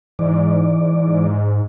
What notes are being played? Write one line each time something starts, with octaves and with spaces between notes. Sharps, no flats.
G#2 E3 D5